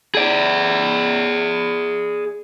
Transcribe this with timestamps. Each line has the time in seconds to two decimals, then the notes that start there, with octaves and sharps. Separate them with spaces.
0.15 G#4 D5